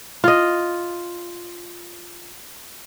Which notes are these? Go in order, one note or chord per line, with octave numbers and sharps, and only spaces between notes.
F4 D#5